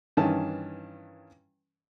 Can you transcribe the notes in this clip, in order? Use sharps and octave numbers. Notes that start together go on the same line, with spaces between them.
G2 D#3 E3 C#4 A5